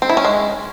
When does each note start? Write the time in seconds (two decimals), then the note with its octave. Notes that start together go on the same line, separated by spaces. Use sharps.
0.02 C4
0.09 E4
0.17 C#4
0.24 G#3